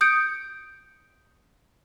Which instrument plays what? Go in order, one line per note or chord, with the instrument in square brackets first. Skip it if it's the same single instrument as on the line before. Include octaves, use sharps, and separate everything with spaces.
[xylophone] D#6 G6 C#7 D7